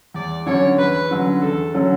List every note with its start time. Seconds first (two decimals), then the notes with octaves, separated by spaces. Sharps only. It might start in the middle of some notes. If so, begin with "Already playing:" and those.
0.14 E2 D5
0.46 D3 F#3 C#4 C#5
0.78 E2 B4
1.11 D3 F#3 C#4
1.42 E2 A4
1.74 D3 F#3 C#4